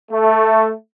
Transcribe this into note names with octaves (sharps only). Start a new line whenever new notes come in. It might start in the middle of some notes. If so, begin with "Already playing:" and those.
A3